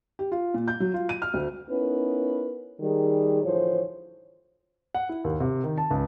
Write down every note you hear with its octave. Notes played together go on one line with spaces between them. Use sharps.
G4
F4
A#2
G6
F#3
F4
D#7
F6
D2
B3 C#4 D#4 E4 A#4 B4
D#3 G3 G#4
D2 A2 E3 F3 C5 C#5
F#5
E4
D#2
C3
D#3
A5
C#2